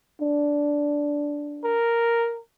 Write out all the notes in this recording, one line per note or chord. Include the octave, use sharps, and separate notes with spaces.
D4
A#4